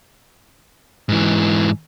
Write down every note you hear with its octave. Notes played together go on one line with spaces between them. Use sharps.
G#2 E3